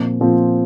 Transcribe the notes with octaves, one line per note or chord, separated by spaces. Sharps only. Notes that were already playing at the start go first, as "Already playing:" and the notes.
Already playing: A#2 F3 C4
A#2 F3 C4